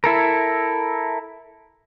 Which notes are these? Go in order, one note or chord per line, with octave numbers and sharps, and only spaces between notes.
E4 A4 A#4